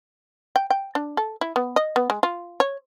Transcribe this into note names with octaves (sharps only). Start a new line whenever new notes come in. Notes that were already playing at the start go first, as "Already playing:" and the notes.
G5
G5
D4
A4
E4
B3
D#5
B3
G#3
F4
C#5